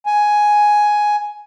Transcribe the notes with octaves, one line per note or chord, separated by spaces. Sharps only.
G#5